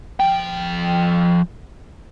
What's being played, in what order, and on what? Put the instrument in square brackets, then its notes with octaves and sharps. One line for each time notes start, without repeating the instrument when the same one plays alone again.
[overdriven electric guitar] F3 G5